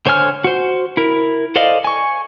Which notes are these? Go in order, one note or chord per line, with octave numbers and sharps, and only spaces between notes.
D3 C5 C#5 G#5 F6
F#4 C5
E4 A#4
A4 C5 D5 D#5 F5
G#5 C#6